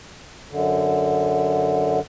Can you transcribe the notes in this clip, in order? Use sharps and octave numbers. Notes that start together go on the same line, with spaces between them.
F#2 D3